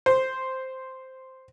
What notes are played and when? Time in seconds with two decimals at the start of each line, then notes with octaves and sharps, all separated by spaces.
0.06 C5